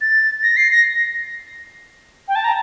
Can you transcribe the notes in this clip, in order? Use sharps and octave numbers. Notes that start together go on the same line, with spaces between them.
A6
A#6
C7
A#6
G5
A5
A#5